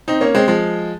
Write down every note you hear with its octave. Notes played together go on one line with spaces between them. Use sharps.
C4 D#4
A#3 C#4
G#3 C4
F3 G#3